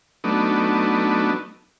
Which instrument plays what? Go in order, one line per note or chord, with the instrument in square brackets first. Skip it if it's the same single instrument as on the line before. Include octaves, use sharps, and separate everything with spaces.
[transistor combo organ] F#3 A3 B3 D4 D#4